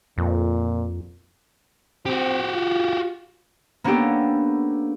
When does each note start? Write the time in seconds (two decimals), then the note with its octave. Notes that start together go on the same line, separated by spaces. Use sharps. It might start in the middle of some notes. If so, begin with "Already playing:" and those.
0.18 F2 A#2
2.06 C4 F#4 G4
2.52 F4
3.84 A#3 B3 C#4 D4 G4 A4